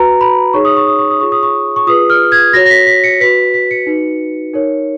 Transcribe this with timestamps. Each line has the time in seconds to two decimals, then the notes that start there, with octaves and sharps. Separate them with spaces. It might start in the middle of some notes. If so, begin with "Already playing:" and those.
Already playing: F#4 B4 A#5
0.21 B5
0.54 D#4 G#4 C#5 C#6
0.65 D#6
0.77 C#6
0.87 D#6
0.99 C#6
1.11 D#6
1.21 F4 G#4 C#5 C#6
1.32 D#6
1.43 C#6
1.76 C#6
1.87 F4 G#4 B4 D#6
2.10 F6
2.32 G#6
2.53 F#4 C#5 A#6
2.66 A#6
2.70 B6
2.87 B6
3.04 C#7
3.20 F#4 B4 B6
3.54 B6
3.71 C#7
3.86 D#4 F#4 B4
4.54 D#4 A#4 C#5